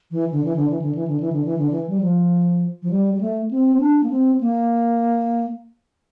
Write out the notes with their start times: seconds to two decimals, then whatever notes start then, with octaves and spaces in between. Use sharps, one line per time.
0.11 E3
0.31 D3
0.44 E3
0.56 D3
0.70 E3
0.82 D3
0.95 E3
1.08 D3
1.20 E3
1.33 D3
1.45 E3
1.58 D3
1.71 E3
1.90 G3
2.01 F3
2.83 F3
2.91 G3
3.14 G3
3.21 A3
3.51 C4
3.75 C4
3.80 D4
4.03 A#3
4.10 C4
4.41 A#3